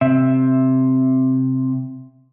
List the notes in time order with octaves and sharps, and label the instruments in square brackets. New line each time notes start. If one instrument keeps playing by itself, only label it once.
[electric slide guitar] C3 E5